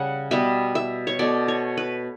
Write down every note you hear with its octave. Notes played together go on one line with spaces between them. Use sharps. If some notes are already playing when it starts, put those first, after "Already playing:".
Already playing: C#3 G3 F#5
B2 G3 B3 E5
E5
C#5
B2 A3 D5
C#5
B4